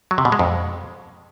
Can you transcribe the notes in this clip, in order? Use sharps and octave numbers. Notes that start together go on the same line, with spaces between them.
F#3
C3
B2
G#3
F2